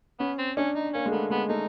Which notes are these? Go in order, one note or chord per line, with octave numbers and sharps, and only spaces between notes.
B3 C#4
C4
C#4 D4
D#4
A#3 C#4
G#3
A3 B3
G#3 B3
A3 D#4